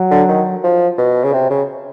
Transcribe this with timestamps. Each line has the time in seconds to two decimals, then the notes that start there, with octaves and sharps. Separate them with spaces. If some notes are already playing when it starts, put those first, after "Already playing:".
Already playing: F#3
0.11 D3
0.29 D#3
0.63 F3
0.98 B2
1.24 C#3
1.33 C3
1.50 C#3